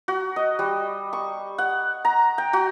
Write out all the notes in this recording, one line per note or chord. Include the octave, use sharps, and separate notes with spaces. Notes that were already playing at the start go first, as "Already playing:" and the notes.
F#4
D#5
G3
C#6
F#5
A#5
G5
F#4